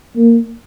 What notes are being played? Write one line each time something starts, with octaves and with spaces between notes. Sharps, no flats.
A#3